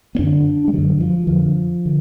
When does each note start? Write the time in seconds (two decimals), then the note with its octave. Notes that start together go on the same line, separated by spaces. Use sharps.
0.15 B3
0.19 F#2 D3 D4
0.68 G#3
0.73 F#2 D3 F#3
1.01 F3
1.27 F2 D3 F3
1.85 D3